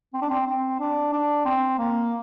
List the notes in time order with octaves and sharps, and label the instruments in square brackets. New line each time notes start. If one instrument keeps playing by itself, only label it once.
[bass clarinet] C4
D4
C4
C4
D4
D4
C4
A#3